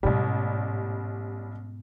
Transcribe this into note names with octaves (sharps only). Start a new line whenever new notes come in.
A1 G#2 B2 G3